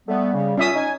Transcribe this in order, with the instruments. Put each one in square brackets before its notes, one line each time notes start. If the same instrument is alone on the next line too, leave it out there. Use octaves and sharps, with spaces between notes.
[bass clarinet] G3 [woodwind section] A3 B3
[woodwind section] C#3
[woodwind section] F#2 F4 [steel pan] C#4 E5 D#6
[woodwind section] D#4 G#5